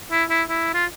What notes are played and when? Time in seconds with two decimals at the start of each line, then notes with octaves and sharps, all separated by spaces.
0.11 E4
0.30 E4
0.49 E4
0.74 F4